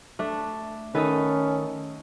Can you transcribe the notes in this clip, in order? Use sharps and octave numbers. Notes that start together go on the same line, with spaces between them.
A3 D4
D#3 C#4 D#4 A4 B4 D#6